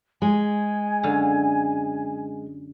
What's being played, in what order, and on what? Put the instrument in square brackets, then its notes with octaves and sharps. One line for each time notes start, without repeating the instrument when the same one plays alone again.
[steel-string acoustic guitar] G#3 [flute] G#5
[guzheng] F#2 D3 F5